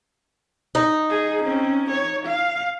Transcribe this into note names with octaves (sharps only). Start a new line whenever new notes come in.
D#4
G#4
C4 C#4
C#5
F5